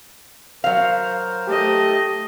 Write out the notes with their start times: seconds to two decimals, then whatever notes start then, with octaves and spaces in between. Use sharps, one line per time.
0.64 F#3 A#4 C5 F5
1.47 A3 G4 D#5